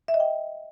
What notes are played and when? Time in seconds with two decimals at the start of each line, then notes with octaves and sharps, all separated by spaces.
0.08 E5
0.14 D#5
0.20 G5